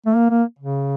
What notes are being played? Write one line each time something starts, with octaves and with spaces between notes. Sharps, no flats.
A3
A#3
A#3
C#3